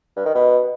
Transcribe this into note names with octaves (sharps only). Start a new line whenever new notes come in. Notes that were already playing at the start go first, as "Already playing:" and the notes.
G2
D#3
B2